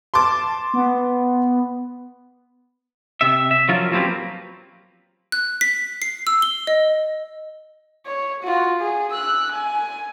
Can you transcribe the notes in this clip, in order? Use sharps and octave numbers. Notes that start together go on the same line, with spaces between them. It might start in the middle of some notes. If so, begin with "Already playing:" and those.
A5 C6 D6
B3
C3 E5
E5
F3 F#3 C#4 F4 A#4
F3 F#3 A#3 C4 G4 B4
F#6
B6
C7
E6
G7
D#5
C#5
F4 F#4
G#4
E6 F#6
G#5